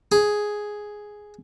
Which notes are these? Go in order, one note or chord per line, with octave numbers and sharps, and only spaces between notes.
G#4